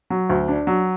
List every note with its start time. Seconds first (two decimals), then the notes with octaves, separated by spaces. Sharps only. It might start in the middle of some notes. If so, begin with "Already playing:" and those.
0.10 F#3
0.29 D2
0.48 D4
0.67 F#3